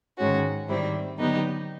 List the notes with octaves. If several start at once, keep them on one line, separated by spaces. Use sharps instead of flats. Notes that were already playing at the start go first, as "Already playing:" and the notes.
G#2 D#3 G#3 C#4 F#4
G#2 D#3 G3 C4 E4
D3 F#3 B3 D#4 G4